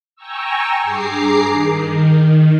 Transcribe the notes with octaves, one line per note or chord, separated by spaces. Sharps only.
G5 G#5 A#5 C#6 E6
G2 G#4 A#5 D6 C7
D#3